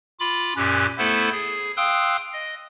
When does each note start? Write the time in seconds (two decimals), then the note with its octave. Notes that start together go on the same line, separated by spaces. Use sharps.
0.20 F4 B5 D6
0.56 F#2 A#2 C#4 G4 F#6
0.98 A3 B3 E4 A4 C5
1.32 G#4
1.77 F5 G5 C6 D#6 E6 F#6
2.34 D#5